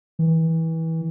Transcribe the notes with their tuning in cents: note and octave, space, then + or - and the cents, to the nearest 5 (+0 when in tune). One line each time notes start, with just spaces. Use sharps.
E3 -25